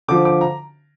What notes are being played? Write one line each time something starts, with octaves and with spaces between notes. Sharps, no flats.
D3 F3 D6
D6
A#5